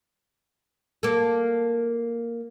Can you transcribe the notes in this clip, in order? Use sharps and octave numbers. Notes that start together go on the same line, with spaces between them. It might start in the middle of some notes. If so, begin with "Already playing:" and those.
A#3 A4